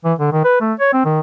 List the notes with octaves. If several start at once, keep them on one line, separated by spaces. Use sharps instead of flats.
E3
D3
D#3
B4
A3
C#5
C4
D#3